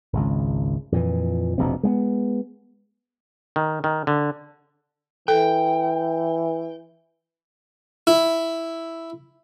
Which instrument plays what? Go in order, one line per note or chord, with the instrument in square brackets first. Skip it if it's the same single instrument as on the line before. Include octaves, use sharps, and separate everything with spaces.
[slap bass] G#1 C#2
F2 A#2 E3
F1 A#1 B2 C4
G#3 A#3 B3
[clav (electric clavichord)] D#3
D#3
D3
[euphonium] E3 [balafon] A4 [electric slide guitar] G5
[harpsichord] E4